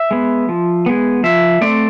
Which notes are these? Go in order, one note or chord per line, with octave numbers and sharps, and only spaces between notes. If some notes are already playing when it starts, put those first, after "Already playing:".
Already playing: E5
G#3 B3
F3
G#3 B3
F3 E5
A3 C4 D5